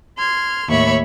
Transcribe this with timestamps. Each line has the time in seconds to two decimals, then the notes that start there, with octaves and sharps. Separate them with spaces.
0.18 C6 F6 G#6
0.70 D#2 A2 C#5 E5 B5 C#6